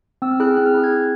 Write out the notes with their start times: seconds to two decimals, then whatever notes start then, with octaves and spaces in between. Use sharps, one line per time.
0.22 C4 E6
0.31 F6
0.40 E4 G#4 F#6
0.48 F6
0.57 C4 F#6
0.66 F6
0.74 E4 G#4 F#6
0.84 G#6
0.92 C4